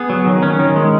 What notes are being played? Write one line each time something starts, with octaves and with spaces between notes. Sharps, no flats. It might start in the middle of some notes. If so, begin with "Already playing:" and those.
Already playing: B3 G#4
F#3
D#3
C#4
D#3
G#3